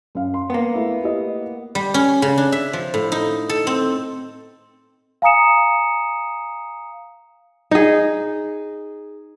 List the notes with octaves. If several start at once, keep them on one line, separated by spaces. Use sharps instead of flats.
F#2 F5
C6
A#3 B3
A3 E4 E5
E4 G4 D#5
G3
C#4
C#3
D4
E5
F3
A2
D#4
A4
C4
F5 G#5 A#5 D#6 C#7 E7
D#4 G#4